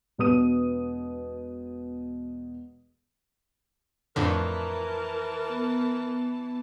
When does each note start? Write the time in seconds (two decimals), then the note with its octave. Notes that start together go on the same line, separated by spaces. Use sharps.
0.18 E1 B2 B4 D#6 D#7
4.16 F2 A2 D3 E3 A#4 A5
5.50 B3